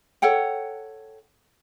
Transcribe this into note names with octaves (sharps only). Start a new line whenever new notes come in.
A4 C#5 F#5 G5